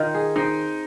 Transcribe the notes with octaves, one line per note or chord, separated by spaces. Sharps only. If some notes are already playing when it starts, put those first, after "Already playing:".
Already playing: D#3 D#4 F4
G#4
C4 D#4